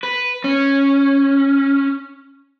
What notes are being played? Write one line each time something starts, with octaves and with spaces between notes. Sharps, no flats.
B4
C#4